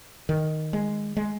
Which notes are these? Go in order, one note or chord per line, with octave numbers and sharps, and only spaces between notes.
D#3
G#3
G#3